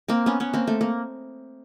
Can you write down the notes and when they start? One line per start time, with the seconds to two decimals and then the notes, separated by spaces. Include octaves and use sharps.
0.08 A#3 C4
0.26 B3 C#4
0.40 B3 C#4
0.53 A#3 C4
0.67 A3
0.81 A#3